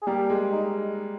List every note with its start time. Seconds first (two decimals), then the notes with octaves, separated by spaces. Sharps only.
0.02 G#4
0.07 G3 A#3 G4
0.30 G#3
0.52 D#4